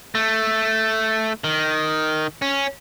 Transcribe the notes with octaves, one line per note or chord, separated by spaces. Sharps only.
A3
D#3
C#4